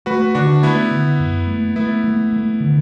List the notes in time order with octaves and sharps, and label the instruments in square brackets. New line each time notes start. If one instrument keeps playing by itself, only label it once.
[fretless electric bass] A3 [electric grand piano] F#4 B4
[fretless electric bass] D3 [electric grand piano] D4 F#4
[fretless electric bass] A3 [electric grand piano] B3 E4
[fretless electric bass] D3
F#2
A3
[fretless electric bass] A3 [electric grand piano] B3 E4
[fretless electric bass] A3
A3
D3